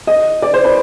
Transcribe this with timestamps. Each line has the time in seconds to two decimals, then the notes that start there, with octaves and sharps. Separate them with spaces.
0.07 D#5
0.42 D5
0.54 C5
0.64 B4